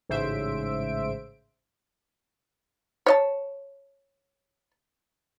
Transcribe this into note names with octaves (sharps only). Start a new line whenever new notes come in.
A1 G#2 C#3 C5 E5 D7
C#5 D#5 A5